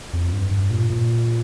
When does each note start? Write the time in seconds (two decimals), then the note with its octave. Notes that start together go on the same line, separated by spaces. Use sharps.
0.13 F2
0.33 G2
0.51 G2
0.70 A#2
0.90 A#2